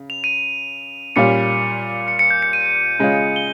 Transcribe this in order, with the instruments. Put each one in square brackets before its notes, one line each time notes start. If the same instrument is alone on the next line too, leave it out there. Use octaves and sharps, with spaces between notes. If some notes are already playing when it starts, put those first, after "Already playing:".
Already playing: [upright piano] C#3
[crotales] F7
D#7
[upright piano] A#2 G3 C#4 F4 [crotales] C#7
[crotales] C#7
C#7
G6
C#7
D#7
[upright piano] C#3 G#3 C#4 F4
[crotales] G7